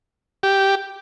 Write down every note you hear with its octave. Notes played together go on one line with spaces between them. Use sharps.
G4